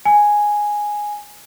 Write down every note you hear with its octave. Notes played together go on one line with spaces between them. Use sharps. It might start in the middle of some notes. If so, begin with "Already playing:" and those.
G#5